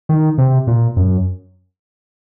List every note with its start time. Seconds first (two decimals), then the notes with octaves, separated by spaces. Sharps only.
0.09 D#3
0.38 C3
0.67 A#2
0.96 F#2